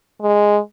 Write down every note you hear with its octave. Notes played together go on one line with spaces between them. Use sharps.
G#3